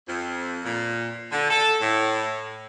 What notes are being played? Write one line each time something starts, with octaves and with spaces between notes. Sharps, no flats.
F2
A#2
D3
A4
A2